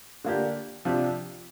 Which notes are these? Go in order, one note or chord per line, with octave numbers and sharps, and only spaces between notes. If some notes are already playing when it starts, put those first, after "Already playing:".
D3 A#3 D4 G4
C3 F3 D4 G4